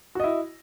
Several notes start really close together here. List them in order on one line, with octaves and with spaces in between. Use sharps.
F#4 D#5 E4